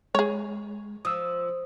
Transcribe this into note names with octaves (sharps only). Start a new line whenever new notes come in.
G#3 G#4 C#5
F3 D#6 E6